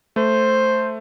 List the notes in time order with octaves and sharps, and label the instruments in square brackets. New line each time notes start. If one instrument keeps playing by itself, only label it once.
[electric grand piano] A3 [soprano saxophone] C5